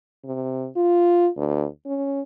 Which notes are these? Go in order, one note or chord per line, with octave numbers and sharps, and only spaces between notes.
C3
F4
D2
C#4